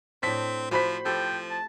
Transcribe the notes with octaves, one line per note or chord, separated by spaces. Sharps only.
A2 C4 D4 B6
F3 C4 F#4 C5 B5 B6
F3 G4 A4 G5
A5